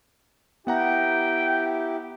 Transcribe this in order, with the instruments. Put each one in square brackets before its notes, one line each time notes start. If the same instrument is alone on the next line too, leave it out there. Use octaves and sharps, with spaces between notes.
[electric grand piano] B3 F#5 A#5 [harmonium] E4 G4 [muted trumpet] G5